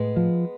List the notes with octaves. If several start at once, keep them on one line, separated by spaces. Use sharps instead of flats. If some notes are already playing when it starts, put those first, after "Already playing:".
Already playing: A2 G#3 B3
F3